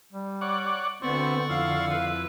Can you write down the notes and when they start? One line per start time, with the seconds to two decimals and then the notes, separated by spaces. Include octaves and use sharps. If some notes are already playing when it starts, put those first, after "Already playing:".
0.13 G3
0.41 C#5 D5 F#5
1.02 D2 D3 B3 C4 D5 F#5 C#6
1.49 F2 E4 F5
1.89 B4